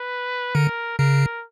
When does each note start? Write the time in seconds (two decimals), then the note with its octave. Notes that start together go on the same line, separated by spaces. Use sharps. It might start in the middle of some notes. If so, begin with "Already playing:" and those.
Already playing: B4
0.55 D3 A#4
0.99 C#3 A#4